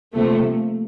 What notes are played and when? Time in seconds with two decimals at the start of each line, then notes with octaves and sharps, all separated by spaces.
0.15 C3 F3 A3 A#3
0.44 A3